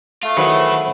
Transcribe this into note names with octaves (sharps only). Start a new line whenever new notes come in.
A3 F4
D#3 F#3 E4 G#4 B4 C5 F#5